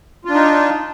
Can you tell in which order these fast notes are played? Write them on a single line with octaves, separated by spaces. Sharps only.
F4 D4 D#4